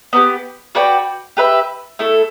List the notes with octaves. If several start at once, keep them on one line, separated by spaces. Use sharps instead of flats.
B3 D4 G4
F#4 B4 D5 G5
G4 B4 E5
A3 E4 A4